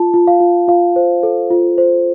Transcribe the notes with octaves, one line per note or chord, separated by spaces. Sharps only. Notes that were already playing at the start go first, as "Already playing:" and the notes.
Already playing: F4 A5
F4
F5
F4
F4 F5
C5
A4
F4
C5